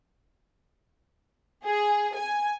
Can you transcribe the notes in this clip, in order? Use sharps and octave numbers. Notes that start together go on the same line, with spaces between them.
G#4
G#5